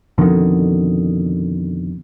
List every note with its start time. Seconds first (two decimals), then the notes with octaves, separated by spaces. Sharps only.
0.18 F2 B2 D3 D#3